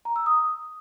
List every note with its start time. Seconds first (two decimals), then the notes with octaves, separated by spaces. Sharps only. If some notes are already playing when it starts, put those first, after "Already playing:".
0.05 A#5
0.16 E6
0.26 D#6